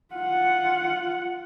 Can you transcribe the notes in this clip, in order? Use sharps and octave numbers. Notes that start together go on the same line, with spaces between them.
F4 F#5